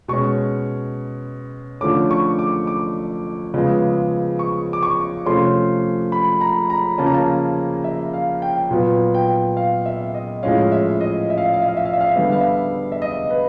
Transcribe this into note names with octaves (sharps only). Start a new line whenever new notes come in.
B2 G#3 C#4 C#6
D3 F3 A3 C#4 D6
C#6
D6
D6
C#3 F3 G#3 B3
C#6
D6
C#6
C3 F3 A3 C#4 C6
B5
A#5
A#5
C#3 F3 A#3 C#4 A5
A#5
A5
E5
F5
G5
A#2 F#3 B3
G5
F5
E5
D#5
A2 F3 G#3 C#4 F5
E5
D#5
E5
F5
E5
F5
E5
F5
E5
F5
E5
F5
E5
D3 G3 B3 F5
E5
F5
E5
E5
D#5
B4